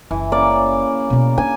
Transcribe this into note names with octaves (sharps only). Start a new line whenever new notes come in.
F#1 E3
C#3 A#3 D5
B2 E3
D4 G#5